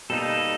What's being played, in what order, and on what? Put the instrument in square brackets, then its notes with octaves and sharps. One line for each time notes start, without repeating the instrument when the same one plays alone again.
[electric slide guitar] B2 G3 A#3 D#4 [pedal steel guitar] A4